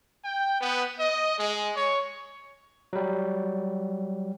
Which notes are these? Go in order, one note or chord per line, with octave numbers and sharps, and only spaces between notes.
G5
B3
D#5
G#3
C#5
F#3 G3